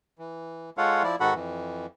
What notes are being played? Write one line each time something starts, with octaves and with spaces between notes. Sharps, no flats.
E3
G#3 F4 A4 C#5 F5 F#5
F3 E4 D5
G#2 D#3 F#4 A4 F#5 B5
F2 E3